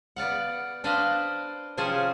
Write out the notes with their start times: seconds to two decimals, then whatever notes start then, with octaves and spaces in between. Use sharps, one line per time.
0.16 B3 D5 F5 F#5
0.84 D4 B4 C5 D5 D#5 F5
1.77 C3 F3 C#4 G#4 C5 A5